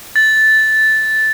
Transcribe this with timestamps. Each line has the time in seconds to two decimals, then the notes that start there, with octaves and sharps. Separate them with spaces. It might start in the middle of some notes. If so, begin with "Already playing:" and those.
0.16 A6